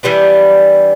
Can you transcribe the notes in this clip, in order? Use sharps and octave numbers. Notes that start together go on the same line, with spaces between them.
E3 G3 B3 D4